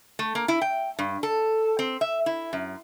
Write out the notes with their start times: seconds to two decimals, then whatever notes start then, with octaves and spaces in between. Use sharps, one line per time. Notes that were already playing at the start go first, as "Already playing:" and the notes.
0.19 A3
0.35 A#3
0.48 E4
0.61 G5
0.99 G2
1.23 A4
1.79 C4
2.01 E5
2.26 E4
2.53 F#2